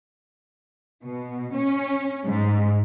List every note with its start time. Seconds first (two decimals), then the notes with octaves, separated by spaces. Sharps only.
1.03 B2
1.54 C#4
2.26 G#2